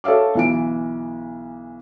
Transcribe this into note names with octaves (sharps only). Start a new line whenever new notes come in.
A4 C#5 E5 F5 D6
B1 E3 D7